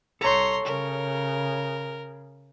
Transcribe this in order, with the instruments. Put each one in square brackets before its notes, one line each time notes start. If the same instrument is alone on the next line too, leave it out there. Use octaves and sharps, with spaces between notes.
[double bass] C2 [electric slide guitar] A4 C#5 [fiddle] A#5 C6
[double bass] C#3 [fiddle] A#4